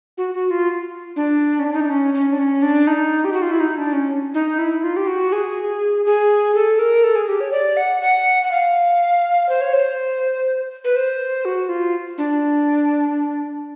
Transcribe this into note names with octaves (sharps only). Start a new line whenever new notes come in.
F#4
F#4
F4
D4
C#4
D4
D#4
D4
C#4
C#4
D4
C#4
D4
D#4
G4
F#4
F4
E4
D#4
D4
C#4
D#4
E4
F4
G4
F#4
G#4
G#4
A4
A#4
A4
G#4
G4
C#5
D5
F#5
F#5
F#5
F5
C5
C#5
C5
B4
C5
F#4
F4
D4